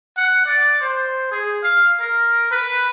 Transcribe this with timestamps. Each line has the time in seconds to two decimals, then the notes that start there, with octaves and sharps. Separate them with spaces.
0.17 F#5
0.46 D5
0.81 C5
1.31 G#4
1.64 F5
2.00 A#4
2.51 B4